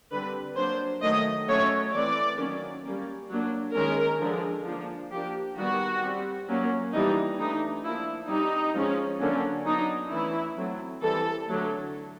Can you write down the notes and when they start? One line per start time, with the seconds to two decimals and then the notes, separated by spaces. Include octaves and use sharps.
0.11 D3 G3 C4 B4
0.57 F#3 A#3 D4 C5
1.02 D#3 F#3 A3 D#5
1.48 F#3 A3 C#4 C#5
1.93 E3 A3 C4 D5
2.39 D#3 F#3 A#3 C#4
2.84 G3 A#3 C#4
3.29 F#3 A#3 D4
3.75 D#3 G#3 C#4 A#4
4.20 D3 F3 G#3
4.65 F3 A#3 D4
5.12 F3 A#3 D4 G4
5.57 D#3 G3 B3 F#4
6.02 G3 C4
6.48 F#3 A#3 C#4
6.93 E3 G3 B3 D4 D#4
7.39 E3 A3 D4 D#4
7.84 F3 A#3 D4 E4
8.29 G3 C4 D#4
8.75 F3 G#3 C#4
9.20 D3 F#3 A#3 C#4
9.66 F#3 B3 D4 D#4
10.12 E3 A3 C#4 E4
10.57 F#3 A3 C4
11.02 E3 G3 C4 A4
11.48 D3 F#3 A3